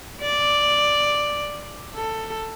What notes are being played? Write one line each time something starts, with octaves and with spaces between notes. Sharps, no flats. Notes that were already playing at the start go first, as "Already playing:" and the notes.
D5
A4